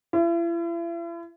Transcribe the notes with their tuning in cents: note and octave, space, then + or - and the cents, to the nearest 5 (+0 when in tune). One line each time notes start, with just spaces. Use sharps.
E4 +40